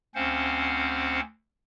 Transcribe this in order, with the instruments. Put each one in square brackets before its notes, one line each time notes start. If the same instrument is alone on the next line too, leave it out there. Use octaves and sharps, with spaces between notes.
[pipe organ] D2 C4 C#4 C5 F5 F#5